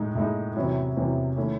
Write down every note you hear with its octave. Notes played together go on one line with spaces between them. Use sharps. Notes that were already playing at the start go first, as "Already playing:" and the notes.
Already playing: A2 G#3 D#4
A2 G#3 D#4
E2 C3 F#3 C#4 E4
E2 C3 F#3 C#4 E4
D#3 A3 C#4 E4